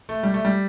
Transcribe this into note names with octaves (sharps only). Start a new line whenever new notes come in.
A3
G3
A3
G3